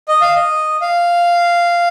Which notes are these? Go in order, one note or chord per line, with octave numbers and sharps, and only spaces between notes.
D#5
F5
D#5
F5